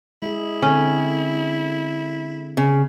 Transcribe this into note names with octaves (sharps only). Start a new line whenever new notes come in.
G#3 E4 G#4
D3 C4 C#4 A4
C#3